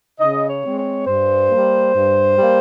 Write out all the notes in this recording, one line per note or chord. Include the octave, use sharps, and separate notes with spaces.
C#3 D#5
C#5
G#3 C4
C#5
G2 C5
G3 A#3
G2
G3 A#3